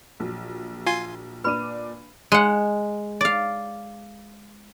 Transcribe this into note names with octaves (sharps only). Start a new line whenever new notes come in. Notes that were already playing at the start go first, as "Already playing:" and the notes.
A#1 F#3
F4 G#5 C6
A#2 D4 B4 B5 D#7
G#3 F#5
D5 F5